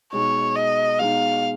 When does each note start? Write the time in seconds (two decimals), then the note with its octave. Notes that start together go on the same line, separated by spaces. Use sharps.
0.13 B2 G#3 D#4 C#5
0.55 D#5
0.99 B2 G#3 D#4 F5